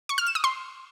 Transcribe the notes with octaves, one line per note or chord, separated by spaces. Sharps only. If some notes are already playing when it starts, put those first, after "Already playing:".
C#6
F6
E7
D#6
C6